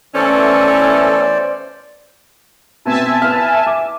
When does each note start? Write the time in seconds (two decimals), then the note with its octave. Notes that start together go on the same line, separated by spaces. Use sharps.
0.15 E3 A3 B3 C#4 A4 C5 D5
2.85 B2 B3 C4 E5 G#5 A5
3.22 B4 F6
3.67 D6